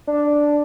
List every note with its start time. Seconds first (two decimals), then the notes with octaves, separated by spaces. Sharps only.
0.07 D4